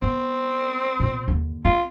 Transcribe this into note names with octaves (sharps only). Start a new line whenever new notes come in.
B3 C4
A#2 B3
D#2 D3
C4 F4